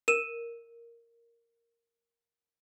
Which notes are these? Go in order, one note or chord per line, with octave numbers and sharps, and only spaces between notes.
A#4 D#7 E7